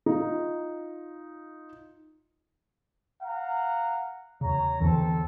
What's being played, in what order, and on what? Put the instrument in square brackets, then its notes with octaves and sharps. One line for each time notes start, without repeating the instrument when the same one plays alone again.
[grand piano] D#4 F4
[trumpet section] F5 F#5 A#5
[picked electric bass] E2 C#3 [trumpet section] C#5 A#5
[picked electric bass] E2 D3 E3 [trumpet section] C4 A4